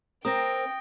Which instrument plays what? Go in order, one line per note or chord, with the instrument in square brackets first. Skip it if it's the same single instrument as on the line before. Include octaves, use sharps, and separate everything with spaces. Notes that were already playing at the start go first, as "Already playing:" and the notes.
[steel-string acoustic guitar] C4 A#4 [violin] G5 [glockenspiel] D#6 A#6